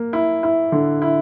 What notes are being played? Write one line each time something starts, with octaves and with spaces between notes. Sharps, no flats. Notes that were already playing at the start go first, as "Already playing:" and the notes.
Already playing: A#3
E4
E4
D3
E4